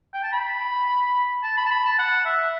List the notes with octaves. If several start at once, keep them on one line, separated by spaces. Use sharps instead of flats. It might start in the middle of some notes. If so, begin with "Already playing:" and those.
G5
A5
B5
A5
B5
A5
B5
A5
F#5
E5